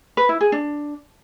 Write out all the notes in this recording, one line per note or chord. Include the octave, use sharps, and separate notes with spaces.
B4
E4
G#4
D4